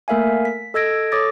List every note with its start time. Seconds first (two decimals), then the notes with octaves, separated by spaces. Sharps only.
0.08 A3 A#3 A#4 E5 F5 G#5
0.45 B6
0.74 A4 D#5 E6 G#6 A#6 D7
1.12 A4 C#5 D6 D#6 A6 A#6